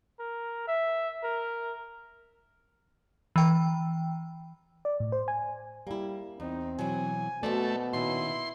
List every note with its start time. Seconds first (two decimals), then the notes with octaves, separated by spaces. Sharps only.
0.19 A#4
0.67 E5
1.24 A#4
3.36 E3 G5
4.85 D5
5.00 A2
5.12 C5
5.28 G#5
5.87 G3 A#3 E4
6.40 E2 C4 D#4
6.79 B2 E3 F#3 G#5
7.43 B2 A3 F#4 C5 D5
7.93 A#2 D#3 C#4 E4 C6